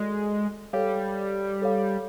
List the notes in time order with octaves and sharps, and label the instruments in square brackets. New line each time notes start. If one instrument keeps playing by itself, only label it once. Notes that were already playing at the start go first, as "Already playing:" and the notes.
Already playing: [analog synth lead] G#3 [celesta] F#4 A4 D5
[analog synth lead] G3 [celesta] A4 C#5 F5
[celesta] A4 C#5 F5